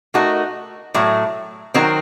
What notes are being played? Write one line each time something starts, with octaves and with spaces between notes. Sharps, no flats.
A3 D#4 F#4 A#4
A2 F#3 A3
D#3 F#3 C4 F#4 A#4